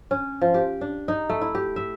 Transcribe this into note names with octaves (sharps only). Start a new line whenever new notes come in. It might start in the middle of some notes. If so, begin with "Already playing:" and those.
C#4
F3
G4
D4
D#4
A3
E4
G4
E5